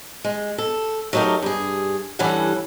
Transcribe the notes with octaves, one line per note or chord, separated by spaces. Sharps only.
G#3
A4
F#3 A3 D#4 G4 A#4
G2 G#4
G2 E3 G3 C#4 A4 F#5